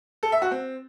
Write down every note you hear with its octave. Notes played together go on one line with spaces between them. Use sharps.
A4
E5
F#4
C4